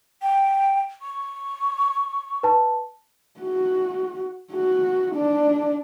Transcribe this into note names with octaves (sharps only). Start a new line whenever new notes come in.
G5
C#6
B4 A5
F#4
F#4
D4